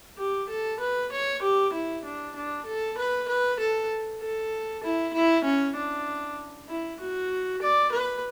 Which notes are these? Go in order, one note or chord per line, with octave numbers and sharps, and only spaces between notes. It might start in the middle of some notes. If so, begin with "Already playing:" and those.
G4
A4
B4
C#5
G4
E4
D4
D4
A4
B4
B4
A4
A4
E4
E4
C#4
D4
E4
F#4
D5
B4